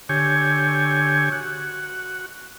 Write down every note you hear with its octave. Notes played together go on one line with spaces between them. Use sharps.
D3 G4 C#5 G#5
F#4